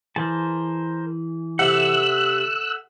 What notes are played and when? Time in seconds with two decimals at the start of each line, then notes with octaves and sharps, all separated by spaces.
0.16 E3 G#4 A#4 C5 A5
1.59 C3 A4 E5 F#5 E6 F#6